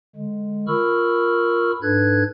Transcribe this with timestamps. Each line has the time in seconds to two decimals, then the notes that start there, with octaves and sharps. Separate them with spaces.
0.16 D3 G#3
0.67 F4 A#4 B5 C#6 E6 F6
1.82 G#2 D4 A4 B4 F#6 G#6